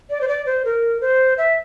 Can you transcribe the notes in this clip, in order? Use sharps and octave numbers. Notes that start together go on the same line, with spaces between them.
D5
C5
D5
C5
A#4
C5
E5